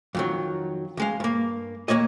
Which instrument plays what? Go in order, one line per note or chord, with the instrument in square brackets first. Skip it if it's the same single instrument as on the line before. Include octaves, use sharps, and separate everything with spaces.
[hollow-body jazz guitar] F2 D#3 F#3
C#2 G#3 F5
G2 A#3
D#2 F3 A#3 C#5 D#5